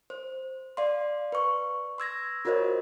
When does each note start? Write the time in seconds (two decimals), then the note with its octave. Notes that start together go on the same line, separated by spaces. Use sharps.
0.10 C5
0.77 D5 F5 C6
1.32 B4 C#6
1.98 C6 E6 G#6 A#6
2.45 F4 F#4 A#4 C5 C#5 D#5